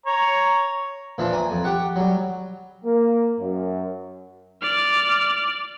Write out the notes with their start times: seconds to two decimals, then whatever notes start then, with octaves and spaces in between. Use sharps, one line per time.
0.06 C#5 A#5
1.18 A#2 E3 F3 D4
1.33 G#5 A#5
1.51 F2
1.64 G4 F#5 C#6
1.96 F#3 G3
2.84 A#3
3.39 F#2
4.62 D5 F6